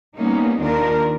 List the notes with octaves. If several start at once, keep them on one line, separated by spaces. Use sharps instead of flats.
G3 A#3 B3 C#4 D#4
D#2 D#3 D4 F4 A#4